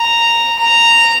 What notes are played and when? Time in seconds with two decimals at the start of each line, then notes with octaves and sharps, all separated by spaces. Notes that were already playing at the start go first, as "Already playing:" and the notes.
Already playing: A#5
0.59 A#5